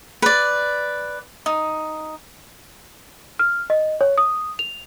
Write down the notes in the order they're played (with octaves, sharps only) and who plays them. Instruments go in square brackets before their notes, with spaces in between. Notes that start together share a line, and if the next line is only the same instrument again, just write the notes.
[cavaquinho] B4 D5
D#4
[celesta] F6
D#5
C#5
D#6
F7